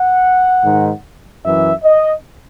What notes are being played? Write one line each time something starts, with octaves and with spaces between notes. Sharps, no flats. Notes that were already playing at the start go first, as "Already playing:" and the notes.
Already playing: F#5
G#2 D#3
F#2 E3 E5
D#5